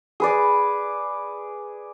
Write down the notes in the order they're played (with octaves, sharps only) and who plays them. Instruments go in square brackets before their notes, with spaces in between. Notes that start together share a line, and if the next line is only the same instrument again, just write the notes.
[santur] G#4 B4 D5